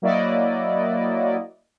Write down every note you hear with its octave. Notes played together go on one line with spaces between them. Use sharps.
F#3 A#3 E4 F#4 D5 D#5